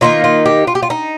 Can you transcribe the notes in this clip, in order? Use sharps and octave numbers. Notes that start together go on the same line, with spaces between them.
D#3 A#3 D#4 F4
F4
G4
F4
G4
F4
D#4